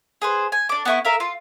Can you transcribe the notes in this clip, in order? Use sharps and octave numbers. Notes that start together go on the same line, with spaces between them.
G#4 B4 C5
G#5
D4 D6
B3 E4 C#6
A#4 E5 F5
F4